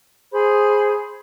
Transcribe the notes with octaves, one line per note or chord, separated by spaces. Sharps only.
G#4 C5 B5